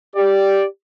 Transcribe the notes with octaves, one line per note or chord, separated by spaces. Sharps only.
G4 D5